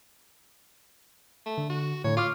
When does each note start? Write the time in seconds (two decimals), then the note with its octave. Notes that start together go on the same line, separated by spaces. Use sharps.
1.46 A3
1.58 D3
1.70 F#4
2.05 A2 D3 C#5
2.17 F4 C#6 D6 F6